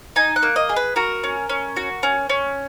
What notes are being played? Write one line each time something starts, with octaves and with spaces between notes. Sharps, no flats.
D#4 G#5
F#5
A#3
D#5
G#4
B4
F#4 A#4
C#4
C#4
F#4
C#4
C#4